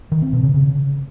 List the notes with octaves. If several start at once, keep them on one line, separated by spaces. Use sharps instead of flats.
D#3
C4
B2
C#3
C#3